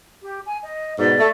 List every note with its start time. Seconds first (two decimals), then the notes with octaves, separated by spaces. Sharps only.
0.23 G4
0.46 G#5
0.63 D#5
0.99 G#2 B2 D5
1.19 A3